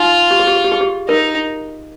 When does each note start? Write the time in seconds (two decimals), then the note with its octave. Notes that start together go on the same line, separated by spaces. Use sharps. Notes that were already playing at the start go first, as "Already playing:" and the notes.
Already playing: D#4 F4
0.31 G4
0.40 G#4
0.47 G4
0.56 G#4
0.64 G4
0.72 G#4
0.81 G4
1.09 D#4 A#4